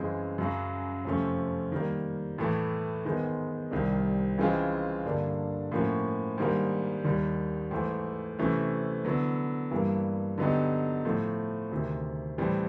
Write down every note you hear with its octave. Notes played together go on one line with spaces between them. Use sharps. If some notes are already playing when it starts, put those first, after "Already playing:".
Already playing: F#2 C#3 E3 G#3 C4
F#2 C#3 F#3
F2 C3 F3 A3 C#4
D#3 G3 A#3
A2 E3 A3
G#2 D#3 G#3 B3
C2 C3 D#3 G3
C#3 E3 G#3 C4 F4
G2 D3 G3 A#3 D4
A2 F3 A#3 C#4 F#4
G#2 D#3 G3 A#3 D4
D#2 D#3 G3
G#2 E3 A3
C3 E3 A3 C#4
D3 F#3 B3 E4
G2 E3 G3 A#3
D3 F#3 B3 D#4 G4
A2 F3 A3
D2 C3 D#3
A2 E3 G3 C4